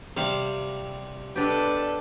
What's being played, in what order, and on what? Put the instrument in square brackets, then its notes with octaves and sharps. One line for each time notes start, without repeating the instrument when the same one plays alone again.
[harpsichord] C3 G3 C4 [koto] F5
[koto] B2 D4 G4 [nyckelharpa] A4 B4 [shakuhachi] D5